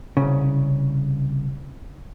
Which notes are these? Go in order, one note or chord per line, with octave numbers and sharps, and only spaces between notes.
C2 C#3